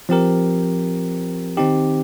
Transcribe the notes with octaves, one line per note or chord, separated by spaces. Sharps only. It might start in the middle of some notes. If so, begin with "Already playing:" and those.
F3 C4 G4 A#4
D#3 C4 D#4 G4